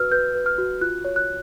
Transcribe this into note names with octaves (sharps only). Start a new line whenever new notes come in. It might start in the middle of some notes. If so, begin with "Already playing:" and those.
Already playing: F#4 B4 E6 F6
B4 G6
B4
F6
F#4
F4 F#6
C#5
F#6